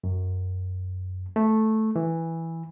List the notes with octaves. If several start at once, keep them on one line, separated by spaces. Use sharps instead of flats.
F#2
A3
E3